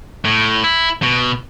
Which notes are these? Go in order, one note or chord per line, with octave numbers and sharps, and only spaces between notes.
A2
E4
B2